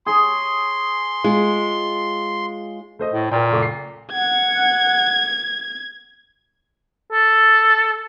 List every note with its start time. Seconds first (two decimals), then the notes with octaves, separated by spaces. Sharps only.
0.06 G#4 C#5 C6
1.24 G#3 F4
2.99 A3 C5 D#5
3.13 A2
3.32 A#2 A#4 G5
3.51 F#1 A3 D6
3.62 C7
4.12 F#5 G#6
7.12 A4